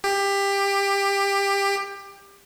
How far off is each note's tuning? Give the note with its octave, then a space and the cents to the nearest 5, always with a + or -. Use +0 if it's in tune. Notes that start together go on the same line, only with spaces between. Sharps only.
G4 +20